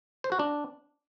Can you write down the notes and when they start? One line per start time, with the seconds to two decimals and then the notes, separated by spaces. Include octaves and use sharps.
0.24 C5
0.32 F#4
0.39 D4